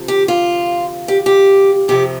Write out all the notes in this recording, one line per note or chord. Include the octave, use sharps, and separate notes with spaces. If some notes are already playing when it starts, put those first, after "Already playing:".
Already playing: D2 C3 F3
G4
F4
G4
G4
F2 C3 F3 G4